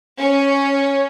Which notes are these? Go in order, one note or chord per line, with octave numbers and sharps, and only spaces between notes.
C#4